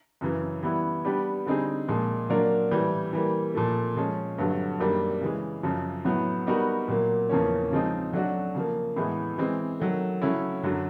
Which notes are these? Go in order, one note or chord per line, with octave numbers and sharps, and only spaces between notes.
F#2 C#3 E3
E3 G3 B3 E4
G3 B3 D4 G4 B4
D3 G3 C4 D#4 G#4
A#2 F3 G#3
F#3 A#3 D4 F4 A#4
A2 E3 G3
E3 G3 A#3
A#2 F3 A3
F3 G#3 C#4
G2 D3 F#3 A3
F#2 D#3 G3 A#3 D4
C#3 E3 G#3
F#2 C#3 F3
A2 F#3 B3
G3 B3 D#4 F#4 A#4
A#2 F#3 A#3
E2 C#3 F3 A#3 C#4
C#3 F3 G#3 C4 D#4
F#3 A3 D4 F#4
C#3 F3 A#3
A2 E3 G#3 B3
E3 G#3 C4
D#3 F#3 A3
C#3 F#3 A3 C#4 E4
F#2 D3 F#3